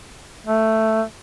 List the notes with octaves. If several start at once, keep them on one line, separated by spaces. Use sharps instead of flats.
A3